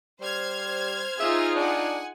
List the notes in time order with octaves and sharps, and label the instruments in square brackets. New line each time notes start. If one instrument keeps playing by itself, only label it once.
[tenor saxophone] G3 [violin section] C5 F6 G#6
[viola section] D#4 F4 G#4 [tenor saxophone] E5
[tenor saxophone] D4 [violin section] F#5 G#5